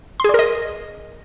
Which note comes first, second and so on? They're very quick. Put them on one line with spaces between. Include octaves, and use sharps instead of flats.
C6 G#4 D5 A#4 D#5